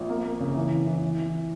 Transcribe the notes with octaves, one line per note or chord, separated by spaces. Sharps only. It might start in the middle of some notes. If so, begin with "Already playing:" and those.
Already playing: A#1
A#3
A#3
C#3
E3
E3
E3
E3
E3